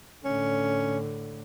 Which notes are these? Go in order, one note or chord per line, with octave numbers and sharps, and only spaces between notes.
A2 D3 C#4